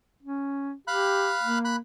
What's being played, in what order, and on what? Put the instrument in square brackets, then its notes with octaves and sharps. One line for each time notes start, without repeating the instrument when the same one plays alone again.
[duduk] C#4
[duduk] G4 [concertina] F5 B5 F#6
[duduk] A#3
[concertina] B5 F#6